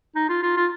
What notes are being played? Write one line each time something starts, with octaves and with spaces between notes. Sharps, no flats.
D#4
F4
F4
F4